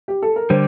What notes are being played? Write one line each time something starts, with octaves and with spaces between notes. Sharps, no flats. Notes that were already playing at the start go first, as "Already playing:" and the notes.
G4
A4
A#4
D3 G3 C5